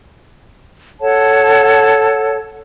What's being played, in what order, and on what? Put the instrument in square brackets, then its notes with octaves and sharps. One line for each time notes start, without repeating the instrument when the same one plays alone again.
[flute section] A4 C#5 F#5 A5